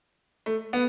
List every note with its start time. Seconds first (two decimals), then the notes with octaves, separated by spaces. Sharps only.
0.46 A3
0.73 B3